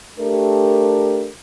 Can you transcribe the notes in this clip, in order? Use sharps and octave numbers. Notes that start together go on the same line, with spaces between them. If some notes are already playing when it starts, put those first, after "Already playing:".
A3 D4 G4 A#4